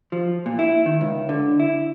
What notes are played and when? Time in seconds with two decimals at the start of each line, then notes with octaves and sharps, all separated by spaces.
0.12 F3
0.46 A#2
0.59 E4
0.86 D#3
1.01 C#2
1.29 D3
1.60 E4